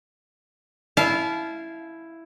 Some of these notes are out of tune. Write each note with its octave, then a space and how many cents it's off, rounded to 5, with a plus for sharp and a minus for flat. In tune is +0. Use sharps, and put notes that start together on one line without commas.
E4 +0 F5 -15 A5 -30